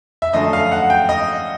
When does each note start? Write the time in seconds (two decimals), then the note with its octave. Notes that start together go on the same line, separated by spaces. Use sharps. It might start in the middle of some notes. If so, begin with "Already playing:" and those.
0.22 E5
0.33 F#2 D3 F3 A3 D#5
0.53 F5
0.72 F#5
0.90 G5
1.09 D#5